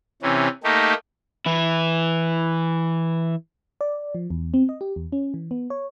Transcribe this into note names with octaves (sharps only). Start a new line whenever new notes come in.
C3 E3 C#4
A3 A#3 D#4 G4
E3 E4
D5
F3
E2
C4
D#5
G4
E2
C#4
E3
B3
C#5